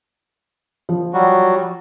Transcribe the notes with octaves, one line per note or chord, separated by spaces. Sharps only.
F3
F#3 G3 F#4